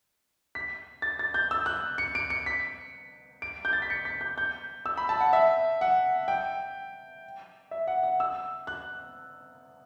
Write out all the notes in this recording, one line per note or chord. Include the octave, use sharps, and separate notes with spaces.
B6
A6
A6
G6
E6
F#6
C#7
D7
C#7
B6
D7
G6
A6
B6
C#7
B6
G6
G6
E6
B5
A5
F#5
E5
F#5
G5
E5
F#5
F#5
E6
F#6